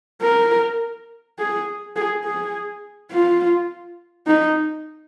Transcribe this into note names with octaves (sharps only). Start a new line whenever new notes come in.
A#4
G#4
G#4
G#4
F4
D#4